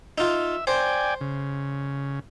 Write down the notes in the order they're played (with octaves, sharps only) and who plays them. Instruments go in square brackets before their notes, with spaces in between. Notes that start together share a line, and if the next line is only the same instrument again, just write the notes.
[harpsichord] D#4 F4 [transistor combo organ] E5
[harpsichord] C5 [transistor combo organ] D5 G5 G#5
[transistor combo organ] C#3